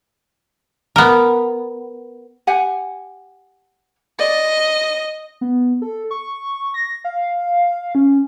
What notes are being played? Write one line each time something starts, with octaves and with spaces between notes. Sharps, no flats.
B3 A#4
G4 F#5 G#5
D5 D#5
B3
A4
C#6
A#6
F5
C#4